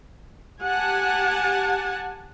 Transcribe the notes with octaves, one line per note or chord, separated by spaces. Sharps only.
G4 F#5 G#5 A5